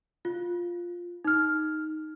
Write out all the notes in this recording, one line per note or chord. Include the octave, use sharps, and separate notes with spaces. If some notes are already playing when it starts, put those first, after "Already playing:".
F4
D#4 F6